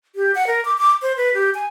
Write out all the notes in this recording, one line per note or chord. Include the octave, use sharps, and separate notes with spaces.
G4
F#5
A#4
D6
D6
C5
B4
G4
G#5